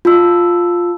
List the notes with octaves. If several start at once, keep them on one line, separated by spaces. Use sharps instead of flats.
F4 A5 E6